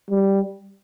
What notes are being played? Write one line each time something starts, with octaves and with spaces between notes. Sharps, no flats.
G3